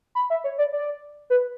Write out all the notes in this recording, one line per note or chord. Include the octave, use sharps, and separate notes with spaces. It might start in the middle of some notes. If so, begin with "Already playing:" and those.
B5
E5
C#5
D5
D5
B4